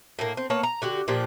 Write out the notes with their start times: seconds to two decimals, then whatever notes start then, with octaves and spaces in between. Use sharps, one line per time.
0.19 A2 A#3
0.37 C4
0.50 A#3 B3 C#5 A5
0.63 A#5
0.82 D3 F#4 G4
1.08 A#2 F3 D4 G4